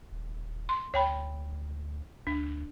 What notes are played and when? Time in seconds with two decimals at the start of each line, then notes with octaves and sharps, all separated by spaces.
0.11 D#1
0.69 C6
0.94 D2 C#5 G5 B5
2.27 D2 D4